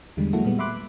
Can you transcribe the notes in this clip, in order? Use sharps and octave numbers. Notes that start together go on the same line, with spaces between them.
E2 D3 G3 G#3
F#3 G#3 A#3 E4 F#4 A4
A#2 G3 G#3 B3
E5 B5 C6 D6 F#6